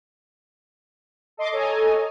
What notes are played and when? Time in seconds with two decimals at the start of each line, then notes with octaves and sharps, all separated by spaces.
1.37 A4 D#5 C6 D6
1.52 A4 C#5 D#5 G#5 A#5